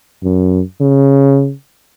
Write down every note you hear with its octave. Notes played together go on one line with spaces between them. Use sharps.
F#2
C#3